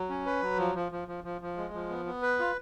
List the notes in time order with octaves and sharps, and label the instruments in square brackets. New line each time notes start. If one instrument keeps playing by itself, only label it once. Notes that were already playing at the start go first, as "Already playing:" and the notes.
Already playing: [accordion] F#3
C#4
B4
F#3
F3
F3
F3
F3
F3
F3
G#3
F3
B3
B3
B4
F4